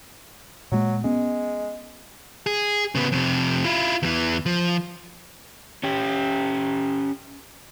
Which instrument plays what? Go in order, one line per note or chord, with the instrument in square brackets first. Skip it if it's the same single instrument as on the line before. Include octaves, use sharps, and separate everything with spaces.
[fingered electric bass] A#2 G#3 A#3 [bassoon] F#3
[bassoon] G#3 [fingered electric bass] B3 C#4
[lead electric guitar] G#4
C#3 B3
F2 C3
E4 F4
E2 E3
F3
[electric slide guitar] C#4 G4